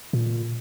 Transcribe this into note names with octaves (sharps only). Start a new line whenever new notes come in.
A#2